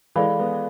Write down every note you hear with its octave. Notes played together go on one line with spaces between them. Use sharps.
E3 G#3 A4 D5 F5 B5
G#3 B3